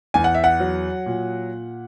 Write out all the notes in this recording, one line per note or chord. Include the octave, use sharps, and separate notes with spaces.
E2 G#5
F#5
E5
F#5
F#3
A#2